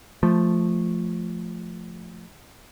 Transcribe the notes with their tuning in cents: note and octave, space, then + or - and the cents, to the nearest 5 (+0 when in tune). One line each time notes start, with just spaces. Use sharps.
F3 +0 A3 +0